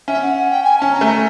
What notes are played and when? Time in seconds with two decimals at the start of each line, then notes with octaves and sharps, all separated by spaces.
0.08 C#4 E5
0.21 F#5
0.35 F#5
0.50 G5
0.63 G#5
0.78 C#4 A5
0.91 A#5
1.01 A3
1.05 A#5